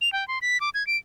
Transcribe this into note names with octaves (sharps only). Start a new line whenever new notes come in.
F7
G5
C6
B6
D6
G#6
D7